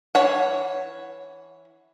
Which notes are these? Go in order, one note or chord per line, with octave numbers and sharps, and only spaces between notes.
E3 C#5 F#5